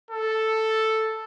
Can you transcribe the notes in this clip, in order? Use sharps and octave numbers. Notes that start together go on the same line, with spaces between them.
A4